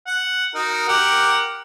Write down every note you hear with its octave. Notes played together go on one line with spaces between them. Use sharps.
F#5
D#4 F#4 A#4
G4 A#4 F#5